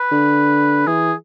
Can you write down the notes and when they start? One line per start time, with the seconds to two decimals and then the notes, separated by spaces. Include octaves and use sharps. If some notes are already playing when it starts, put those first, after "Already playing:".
Already playing: B4
0.12 D3
0.87 E3 G#4